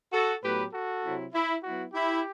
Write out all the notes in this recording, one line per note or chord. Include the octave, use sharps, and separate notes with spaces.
F#4 A4
A2 F#3 B3 G4 B4
F#4 A4
C3 F#3 C4 E4
E4
F#3 B3 E4 F#4
E4 G4